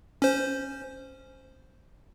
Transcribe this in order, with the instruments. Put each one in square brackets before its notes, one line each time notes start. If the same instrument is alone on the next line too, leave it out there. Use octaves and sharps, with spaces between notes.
[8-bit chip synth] C#4 C5